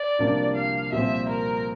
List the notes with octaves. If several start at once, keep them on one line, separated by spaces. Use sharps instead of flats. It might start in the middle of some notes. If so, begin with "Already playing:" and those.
Already playing: D5
C2 C3 F3 A#3 D4
F5
C2 A#2 F3 C4 E5
A#4